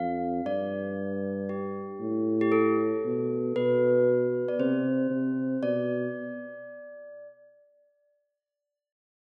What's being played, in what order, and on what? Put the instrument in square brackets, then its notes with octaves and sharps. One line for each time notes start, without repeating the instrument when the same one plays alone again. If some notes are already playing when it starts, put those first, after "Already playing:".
Already playing: [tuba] F2 [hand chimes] F5
[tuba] G2 [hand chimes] D5
[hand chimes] G4
[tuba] A2
[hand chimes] G4
A4
[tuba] B2
[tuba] B2 [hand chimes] B4
[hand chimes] D5
[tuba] C3 [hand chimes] C5
[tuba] C3
[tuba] B2 [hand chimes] D5